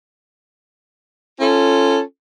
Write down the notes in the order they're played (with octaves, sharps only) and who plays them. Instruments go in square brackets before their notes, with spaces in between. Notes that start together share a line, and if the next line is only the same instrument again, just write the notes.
[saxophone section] C#4 F4 A4